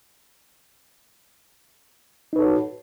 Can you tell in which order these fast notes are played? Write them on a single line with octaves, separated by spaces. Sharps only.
D#4 B4 A4 C#5 F#4